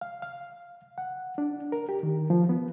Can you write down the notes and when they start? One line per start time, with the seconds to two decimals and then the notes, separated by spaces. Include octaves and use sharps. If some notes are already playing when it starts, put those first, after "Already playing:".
0.01 F5
0.22 F5
0.98 F#5
1.38 D4
1.72 A#4
1.89 G4
2.03 D#3
2.30 F3
2.49 B3